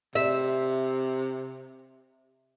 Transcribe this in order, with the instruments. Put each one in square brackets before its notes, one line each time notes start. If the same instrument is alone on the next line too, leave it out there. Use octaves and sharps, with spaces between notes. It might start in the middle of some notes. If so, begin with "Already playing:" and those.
[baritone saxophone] C3 [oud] E5